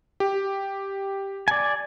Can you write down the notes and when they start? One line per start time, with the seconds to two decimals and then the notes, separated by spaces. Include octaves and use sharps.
0.20 G4
1.48 D5 G#5